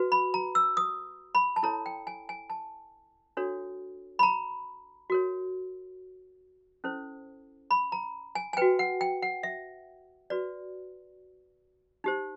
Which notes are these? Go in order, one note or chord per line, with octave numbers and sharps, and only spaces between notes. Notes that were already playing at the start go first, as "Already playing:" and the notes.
Already playing: F#4 B4
B5
A#5
E6
D#6
B5
A5
E4 A4 C#5 A#5
G5
G#5
G#5
A5
D4 F#4 A4 C#5
B5
A#5
F#4 A#4 C#5
C#4 E4 A4 C5
B5
A#5
G#5
G#5
F#4 B4 G5
F#5
G5
F#5
E5
F#4 B4 D5
D#4 G4 C5